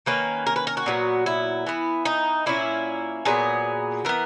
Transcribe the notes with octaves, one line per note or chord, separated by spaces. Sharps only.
D#3 A#3 C#4 B4
A#4
B4
A#4
F#4
A#2 F#3 B3
E4
E3 B3
D#4
A#2 A#3 C#4 E4
A#2 F#3 B3 G#4
E3 B3 A#4